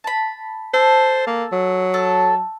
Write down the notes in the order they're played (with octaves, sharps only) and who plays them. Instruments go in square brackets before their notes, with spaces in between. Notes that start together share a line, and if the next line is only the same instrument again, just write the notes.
[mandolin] A5 B5
[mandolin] A4 [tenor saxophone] C5
[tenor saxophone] A#3
F#3
[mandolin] A4